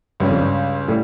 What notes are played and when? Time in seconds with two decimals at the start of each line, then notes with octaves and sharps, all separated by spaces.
0.20 C#2 G2 C#3 G3 C#4
0.31 F2
0.41 G2
0.88 A2 G3